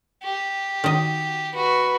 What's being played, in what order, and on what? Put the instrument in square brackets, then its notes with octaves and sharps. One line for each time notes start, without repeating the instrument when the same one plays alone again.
[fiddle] G4
[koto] D#3 D#5 [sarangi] F#4
[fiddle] F#4 [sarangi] B4